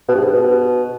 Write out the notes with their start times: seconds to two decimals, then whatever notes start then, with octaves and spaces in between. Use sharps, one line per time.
0.08 B2
0.15 G2
0.21 G#2
0.27 G2
0.33 B2